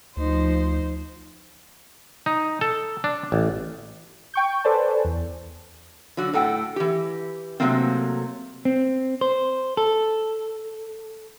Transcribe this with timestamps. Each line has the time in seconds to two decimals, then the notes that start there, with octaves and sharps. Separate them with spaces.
0.17 D2 F3 D#4 C5
2.26 D#4
2.61 A4
3.04 D4
3.32 A1
4.34 G5 C#6 G6
4.64 A4 B4 C5 D5 G#5 A5
5.05 E2
6.17 D3 F#3 F#4
6.34 A2 A4 F#5 G5
6.76 E3 G4
7.60 C3 D#3 F#3 A3 A#3 C4
8.65 C4
9.21 C5
9.77 A4